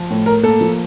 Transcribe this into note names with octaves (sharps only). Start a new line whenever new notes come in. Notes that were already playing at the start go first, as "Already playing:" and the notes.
Already playing: F3
A2
A2 A#4
A#3 A4
F3